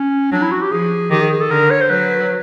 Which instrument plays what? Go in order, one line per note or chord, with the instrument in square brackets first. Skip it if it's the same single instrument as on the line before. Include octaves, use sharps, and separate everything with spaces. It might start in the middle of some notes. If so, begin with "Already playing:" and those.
Already playing: [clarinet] C#4
[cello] F#3 [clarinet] D4
[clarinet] E4
F#4
G4
[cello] F3 [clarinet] G#4
[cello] D#3 [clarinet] G4
[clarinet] G#4
G#4
A4
[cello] D3 [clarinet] A#4
[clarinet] C#5
C5
[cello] F#3 [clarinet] B4